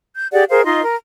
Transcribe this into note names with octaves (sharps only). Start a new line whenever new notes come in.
G6
G4 G#4 D5 F#5
G#4 A#4 C5 F5
D#4 F4 D#5 C6
A#4